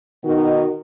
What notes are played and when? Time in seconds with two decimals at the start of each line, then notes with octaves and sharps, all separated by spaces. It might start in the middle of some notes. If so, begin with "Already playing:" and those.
0.24 B2 D#3 D#4 F#4